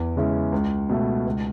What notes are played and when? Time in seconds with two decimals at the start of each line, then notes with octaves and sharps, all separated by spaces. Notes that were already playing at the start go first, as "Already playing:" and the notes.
Already playing: E2
0.16 C#3 G#3 C#4 E4
0.52 C#2
0.89 B2 A3
1.26 C#2